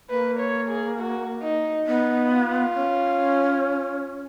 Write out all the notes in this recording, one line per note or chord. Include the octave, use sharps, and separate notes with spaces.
A#3 B4
C#5
G#4
F#4
D#4
B3 D#4
F4
C#4